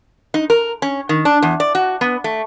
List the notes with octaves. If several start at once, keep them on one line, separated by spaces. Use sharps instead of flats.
D#4
A#4
C#4
D#3
D4
E2
D5
F#4
B3
A3